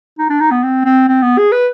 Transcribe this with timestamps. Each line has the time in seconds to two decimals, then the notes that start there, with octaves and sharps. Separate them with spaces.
0.19 D#4
0.30 D4
0.40 D#4
0.51 B3
0.63 C4
0.85 C4
1.08 C4
1.22 B3
1.38 G#4
1.52 B4